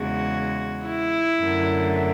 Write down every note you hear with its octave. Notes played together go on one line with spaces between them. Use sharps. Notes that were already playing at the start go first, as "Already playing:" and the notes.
Already playing: E2 C#3 G#3 F#4
E4
F#2 D3 A3